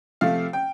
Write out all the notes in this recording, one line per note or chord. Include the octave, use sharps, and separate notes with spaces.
C3 F3 A3 F5
G5